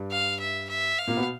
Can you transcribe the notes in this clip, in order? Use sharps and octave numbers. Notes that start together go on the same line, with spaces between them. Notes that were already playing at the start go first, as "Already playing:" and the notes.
Already playing: G2 G3
F5
E5
E5
F5
A#2 A#3
B2 B3